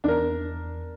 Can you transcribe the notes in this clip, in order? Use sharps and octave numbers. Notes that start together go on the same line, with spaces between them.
E2 D4 A#4